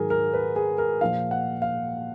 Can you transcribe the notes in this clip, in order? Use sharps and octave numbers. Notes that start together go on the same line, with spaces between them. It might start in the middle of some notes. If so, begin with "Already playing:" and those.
Already playing: G#2 D#3 F#3 G#4 A#4
A#4
B4
G#4
A#4
A#2 F3 F5
F#5
F5